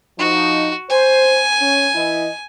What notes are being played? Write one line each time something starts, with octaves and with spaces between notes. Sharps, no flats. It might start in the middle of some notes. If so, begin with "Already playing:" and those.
F3 D#4 F#4
C5 G#5
C#4
E3 E4 D#5